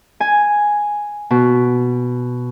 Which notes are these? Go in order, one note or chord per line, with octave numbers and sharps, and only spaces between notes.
G#5
B2